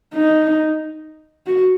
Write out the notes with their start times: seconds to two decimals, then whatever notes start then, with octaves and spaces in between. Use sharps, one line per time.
0.15 D#4
1.47 F#4